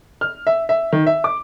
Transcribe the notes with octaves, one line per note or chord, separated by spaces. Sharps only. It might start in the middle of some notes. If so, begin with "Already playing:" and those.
F6
E5
E5
D#3
E5
D6